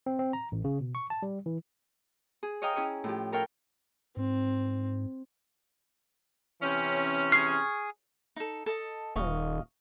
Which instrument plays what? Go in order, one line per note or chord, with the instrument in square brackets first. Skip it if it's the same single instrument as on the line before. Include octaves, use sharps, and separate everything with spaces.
[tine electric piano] C4
C4
A#5
A1
C#3
B2
C#6
A5
G3
E3
[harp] G#4
C#5 D#5 F5 G5 A#5 D#6
C#4 E4 G#4 C#5
A2 F3 G4
A4 A#4 C#5 F5 G5
[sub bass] G#2 [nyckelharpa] C4
[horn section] C3 E3 C#4
[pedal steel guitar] G#4 C#6 F6 [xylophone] C7
[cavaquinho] D#4 A4
A4 D#5 A5
[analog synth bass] D#1 [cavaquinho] D#5 F5 C#6